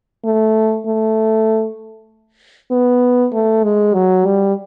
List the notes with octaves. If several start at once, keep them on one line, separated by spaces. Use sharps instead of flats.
A3
A3
B3
A3
G#3
F#3
G3